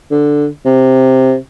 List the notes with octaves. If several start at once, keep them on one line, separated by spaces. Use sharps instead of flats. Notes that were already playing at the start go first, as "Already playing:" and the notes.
D3
C3